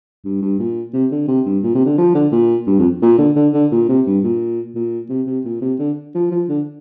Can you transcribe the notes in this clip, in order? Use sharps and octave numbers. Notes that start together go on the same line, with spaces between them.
G2
G2
A#2
C3
D3
C3
G2
A#2
C3
D3
F3
D3
A#2
G2
F2
A#2
D3
D3
D3
A#2
C3
G2
A#2
A#2
C3
C3
A#2
C3
D3
F3
F3
D3